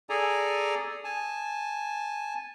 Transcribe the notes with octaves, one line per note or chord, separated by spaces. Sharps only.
G#4 A4 D5 G#5 A#5
G#5 A5